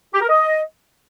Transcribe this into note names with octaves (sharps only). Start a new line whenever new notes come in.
G4
A#4
D#5